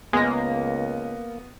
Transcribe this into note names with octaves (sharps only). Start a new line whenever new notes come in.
C#2 G#3 A#3 B3 A#6